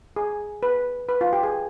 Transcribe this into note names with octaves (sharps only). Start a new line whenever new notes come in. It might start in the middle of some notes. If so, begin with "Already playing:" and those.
G#4
B4
B4
F4
G4
G#4